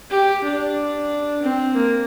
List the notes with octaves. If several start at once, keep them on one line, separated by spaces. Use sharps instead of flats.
G4
D4
C4
A#3